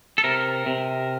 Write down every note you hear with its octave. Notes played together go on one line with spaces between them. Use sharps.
A4
C3 A#4
C3